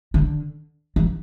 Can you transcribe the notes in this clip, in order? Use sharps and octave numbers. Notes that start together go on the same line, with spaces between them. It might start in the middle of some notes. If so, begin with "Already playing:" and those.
D3
E3